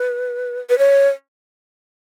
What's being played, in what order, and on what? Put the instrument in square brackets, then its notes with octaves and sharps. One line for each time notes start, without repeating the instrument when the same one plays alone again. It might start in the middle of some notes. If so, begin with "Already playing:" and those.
Already playing: [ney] B4
B4
C#5